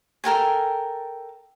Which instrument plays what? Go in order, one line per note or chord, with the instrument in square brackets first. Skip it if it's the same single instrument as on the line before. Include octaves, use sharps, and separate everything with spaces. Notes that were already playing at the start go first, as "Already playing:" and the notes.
[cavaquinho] A4 A#4 G5 G#5